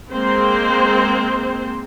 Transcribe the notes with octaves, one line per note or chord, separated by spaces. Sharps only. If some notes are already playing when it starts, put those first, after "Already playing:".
G#3 A#3 C4 C5